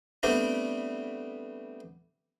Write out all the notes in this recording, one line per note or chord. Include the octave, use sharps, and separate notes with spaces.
G3 A3 B3 C4 D4